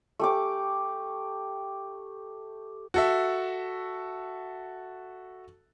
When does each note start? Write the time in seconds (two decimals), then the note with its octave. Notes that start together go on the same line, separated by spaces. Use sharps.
0.19 A3 G4 D6
2.94 F#4 A4 E5